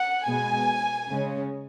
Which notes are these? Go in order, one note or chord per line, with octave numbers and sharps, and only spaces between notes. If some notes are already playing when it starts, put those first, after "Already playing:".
Already playing: F#5
B2 G#3 B3 G#5
C#3 G#3 C#4